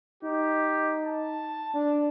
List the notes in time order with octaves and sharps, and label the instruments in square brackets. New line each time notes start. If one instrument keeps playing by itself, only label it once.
[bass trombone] D#4 [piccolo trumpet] G4
[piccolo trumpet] A5
[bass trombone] D4